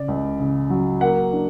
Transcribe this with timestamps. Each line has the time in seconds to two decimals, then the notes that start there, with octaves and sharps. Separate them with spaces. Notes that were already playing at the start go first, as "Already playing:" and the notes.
Already playing: C#3 D5
0.08 C#2
0.40 C#3
0.70 F#3
1.01 A#3 F#5
1.33 D4